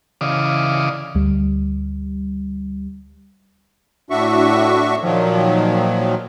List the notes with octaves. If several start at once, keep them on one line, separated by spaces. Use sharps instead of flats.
C#3 E3 D5 D#5 F5 D#6
D2 G3
A2 D4 F#4 E5 C#6
A#2 D#3 F3 F#3